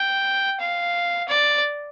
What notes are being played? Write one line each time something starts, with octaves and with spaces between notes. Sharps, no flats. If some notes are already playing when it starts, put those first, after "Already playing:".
Already playing: G5
F5
D5